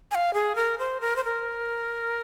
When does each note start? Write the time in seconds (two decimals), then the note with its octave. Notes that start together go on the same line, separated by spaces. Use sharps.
0.11 G#5
0.15 F5
0.34 G#4
0.56 A#4
0.79 C5
1.01 A#4
1.16 C5
1.24 A#4